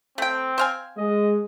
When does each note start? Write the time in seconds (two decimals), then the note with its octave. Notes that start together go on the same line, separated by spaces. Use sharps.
0.18 A3 C4 G5
0.58 C5 F5 G#5
0.98 G#3 D#5